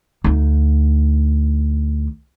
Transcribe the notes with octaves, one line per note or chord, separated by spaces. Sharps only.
D2 D#4